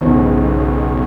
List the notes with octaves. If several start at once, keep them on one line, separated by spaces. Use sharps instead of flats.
B1 E2 G#2 C#3